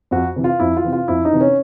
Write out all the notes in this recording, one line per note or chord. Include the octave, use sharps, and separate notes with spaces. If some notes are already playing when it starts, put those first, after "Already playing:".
F2 F#4
C3 E3
F4
F2 E4
F4
C3 E3
F4
F2 E4
D#4
C3 E3
C#4